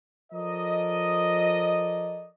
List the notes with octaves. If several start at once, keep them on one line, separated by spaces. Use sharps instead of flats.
F3 A4 A#4 D5 D#5